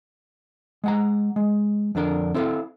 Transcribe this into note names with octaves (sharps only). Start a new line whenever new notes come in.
G#3 F#5 A#5
G#3
F2 D3 D4 A#4
C4 E4 A4 C5 E5 F5